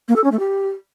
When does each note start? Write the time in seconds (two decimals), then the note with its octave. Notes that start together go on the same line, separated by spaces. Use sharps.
0.08 A#3
0.16 A4
0.24 C#4
0.32 A3
0.39 G4